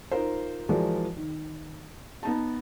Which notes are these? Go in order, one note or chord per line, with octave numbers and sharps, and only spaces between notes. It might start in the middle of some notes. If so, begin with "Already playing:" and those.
D#4 F4 A#4 C5
E3 F3 G#3 F#4 A#4 D5
D#3
B3 D#4 A5